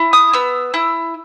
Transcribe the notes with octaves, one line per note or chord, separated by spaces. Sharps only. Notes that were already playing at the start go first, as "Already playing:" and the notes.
Already playing: E4
D#6
B3 E6
E4 E6